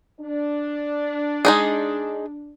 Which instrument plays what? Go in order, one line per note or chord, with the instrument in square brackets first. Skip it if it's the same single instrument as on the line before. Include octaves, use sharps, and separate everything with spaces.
[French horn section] D4
[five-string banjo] G#3 D#4 G#4